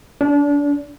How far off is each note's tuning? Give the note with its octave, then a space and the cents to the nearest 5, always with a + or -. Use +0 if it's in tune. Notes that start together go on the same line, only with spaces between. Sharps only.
D4 -30